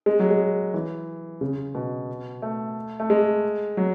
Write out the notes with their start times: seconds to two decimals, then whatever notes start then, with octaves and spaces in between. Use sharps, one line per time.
0.06 G#3
0.19 F#3
0.31 G#3
0.74 E3
1.41 C#3
1.75 B2
2.42 A3
3.00 A3
3.10 G#3
3.77 F#3